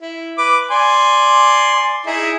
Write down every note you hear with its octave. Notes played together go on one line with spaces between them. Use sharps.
E4
B4 D6
D5 G#5 C6
D#4 E4 G#4